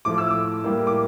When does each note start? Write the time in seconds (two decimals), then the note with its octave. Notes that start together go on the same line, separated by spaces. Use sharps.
0.05 A2 F3 A3 D6
0.18 E6
0.30 D6
0.64 A2 G3 A#3
0.87 D6